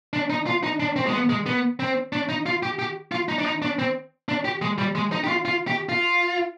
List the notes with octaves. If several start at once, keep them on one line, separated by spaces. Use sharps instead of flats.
D4
D#4
F4
D#4
D4
C4
G#3
B3
G#3
B3
C4
D4
D#4
F4
G4
G4
F4
D#4
D4
D#4
D4
C4
D4
G4
G#3
G3
G#3
D#4
G4
F4
F4
G4
F4